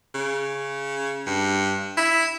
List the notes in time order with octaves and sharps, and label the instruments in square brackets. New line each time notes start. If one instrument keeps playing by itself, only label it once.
[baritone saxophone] C#3
G2
E4